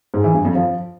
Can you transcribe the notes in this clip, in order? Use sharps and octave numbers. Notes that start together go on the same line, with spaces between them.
G#2
E3
G2
F2
F3